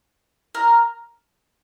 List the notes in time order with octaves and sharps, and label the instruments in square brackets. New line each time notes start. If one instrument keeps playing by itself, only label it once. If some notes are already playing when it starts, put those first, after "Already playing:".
[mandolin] A#4